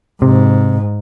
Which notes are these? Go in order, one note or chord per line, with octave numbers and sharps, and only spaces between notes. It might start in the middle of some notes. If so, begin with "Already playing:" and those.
G#2 C3